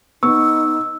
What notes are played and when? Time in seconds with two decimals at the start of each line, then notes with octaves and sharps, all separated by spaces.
0.23 B3 D#4 C#6 E6